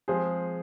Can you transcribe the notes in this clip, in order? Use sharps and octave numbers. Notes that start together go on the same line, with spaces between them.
F3 G#3 C4 G#4 C5